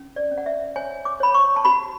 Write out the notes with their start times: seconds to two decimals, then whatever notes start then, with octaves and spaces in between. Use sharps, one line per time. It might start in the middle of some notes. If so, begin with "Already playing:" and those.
Already playing: C#4
0.16 D5
0.31 C#4
0.38 F#5
0.46 E5
0.76 C#5 G#5
1.05 D6
1.20 C#5 B5
1.34 C#6
1.56 A5
1.65 F#4 B5